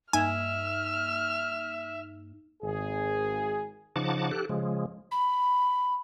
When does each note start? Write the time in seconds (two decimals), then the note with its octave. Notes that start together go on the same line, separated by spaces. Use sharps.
0.13 G2 A#3 D#4 E5 G#5 F6
2.62 G#1 G#4
3.96 C#3 F3 D#4 F#5 A5 D6
4.31 G4 A4 F#6
4.49 C#3 F3 G#3
5.11 B5